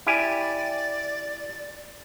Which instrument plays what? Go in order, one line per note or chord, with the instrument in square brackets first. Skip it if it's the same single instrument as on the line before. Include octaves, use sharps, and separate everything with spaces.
[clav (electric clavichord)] E4 G4 G#5 [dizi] D5